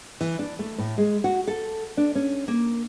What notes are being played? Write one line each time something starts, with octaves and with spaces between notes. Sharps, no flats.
E3
D4
A3
A2
G#3
F#4
A4
D4
C#4
A#3